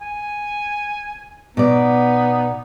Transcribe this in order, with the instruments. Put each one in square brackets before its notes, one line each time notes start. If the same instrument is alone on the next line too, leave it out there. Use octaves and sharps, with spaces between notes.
[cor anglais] G#5
[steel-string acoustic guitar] B2 D5 [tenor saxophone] B3 [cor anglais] D#4